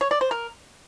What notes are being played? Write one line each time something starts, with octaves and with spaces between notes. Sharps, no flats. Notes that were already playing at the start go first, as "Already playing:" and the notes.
C#5
D5
C5
A#4